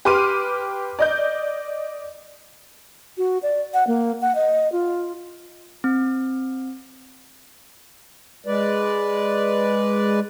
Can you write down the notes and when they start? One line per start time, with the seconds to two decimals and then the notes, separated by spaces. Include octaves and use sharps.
0.05 G4 B4 C6 D6 F6 D#7
0.99 D5 D#5 G6
3.18 F#4
3.43 D5
3.74 F#5
3.87 A#3
4.21 F#5
4.35 D#5
4.72 F4
5.84 C4
8.46 G#3 B4 D5